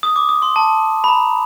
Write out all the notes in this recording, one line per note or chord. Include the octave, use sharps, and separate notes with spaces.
D#6
D6
D#6
C6
A5
B5
A#5